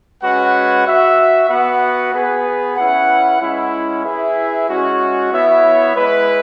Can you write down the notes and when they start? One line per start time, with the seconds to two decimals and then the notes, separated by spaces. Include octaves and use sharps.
0.22 G#3 C#4 F#4 B4 F#5
0.86 F#4 E5
1.49 B3 F#4 B4 F#5
2.12 B3 G#4 B4
2.76 C#4 E4 B4 F#5
3.40 G#3 C#4 E4
4.04 E4 G#4 B4 E5
4.67 G#3 C#4 F#4
5.31 B3 E4 C#5 E5
5.95 G#3 E4 B4